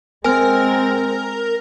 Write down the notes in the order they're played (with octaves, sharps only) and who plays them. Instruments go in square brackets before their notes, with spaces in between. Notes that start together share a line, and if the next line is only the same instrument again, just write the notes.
[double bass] G#3 C4 [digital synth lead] A#4 [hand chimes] G#5 F6